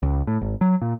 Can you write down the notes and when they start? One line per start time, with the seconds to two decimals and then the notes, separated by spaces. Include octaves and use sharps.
0.03 C#2
0.27 A2
0.41 G#1
0.61 F#3
0.82 A#2